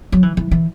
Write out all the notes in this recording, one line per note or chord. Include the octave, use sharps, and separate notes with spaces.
F#3
E3
E3
E3